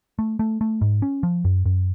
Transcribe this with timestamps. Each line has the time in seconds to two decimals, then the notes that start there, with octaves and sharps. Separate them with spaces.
0.19 A3
0.39 A3
0.61 A3
0.81 G#2
1.02 C#4
1.23 F3
1.45 F#2
1.65 F#2